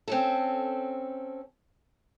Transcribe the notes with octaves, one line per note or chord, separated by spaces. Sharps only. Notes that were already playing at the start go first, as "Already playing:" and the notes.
C4 C#4 A4